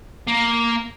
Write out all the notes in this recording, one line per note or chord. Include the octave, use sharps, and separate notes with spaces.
A#3